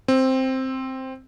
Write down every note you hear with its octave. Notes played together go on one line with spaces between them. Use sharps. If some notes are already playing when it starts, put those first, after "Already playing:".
C4